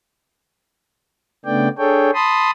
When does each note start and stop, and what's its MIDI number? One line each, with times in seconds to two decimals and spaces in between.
1.45 1.69 49
1.45 1.69 57
1.45 1.69 59
1.45 1.69 62
1.45 1.69 74
1.45 1.69 79
1.78 2.11 62
1.78 2.11 68
1.78 2.11 69
1.78 2.11 73
1.78 2.11 79
2.14 2.51 81
2.14 2.51 83
2.14 2.51 84
2.14 2.51 87